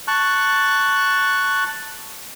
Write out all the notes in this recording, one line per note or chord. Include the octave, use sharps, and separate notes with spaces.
A5 C#6 F#6